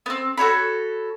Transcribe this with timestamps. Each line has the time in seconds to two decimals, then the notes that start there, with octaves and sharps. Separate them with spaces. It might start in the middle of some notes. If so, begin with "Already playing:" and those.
0.06 B3 C4
0.37 F#4 A4 C#5 B5